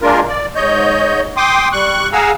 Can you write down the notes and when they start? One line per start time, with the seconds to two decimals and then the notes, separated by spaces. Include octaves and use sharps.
0.01 G#3 A#3 D4 F4 A#4
0.28 D5
0.56 G#2 C#5 D#5 G6
1.37 G5 C6 D6 D#6
1.72 G3 C#6 F#6
2.13 G#4 F5 F#5 G#5 A#5 E6